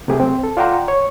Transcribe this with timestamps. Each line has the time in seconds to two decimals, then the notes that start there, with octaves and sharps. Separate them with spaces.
0.08 C3 F#3 A3 G4 G#4
0.20 C4
0.44 A4
0.57 F4 D5 F#5 G5 A#5 C6
0.88 C#5